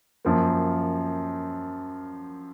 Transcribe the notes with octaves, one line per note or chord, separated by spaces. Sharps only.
F#2 F3 A#3